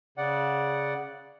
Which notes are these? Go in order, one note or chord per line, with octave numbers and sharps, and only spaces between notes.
C#3 D5 F#5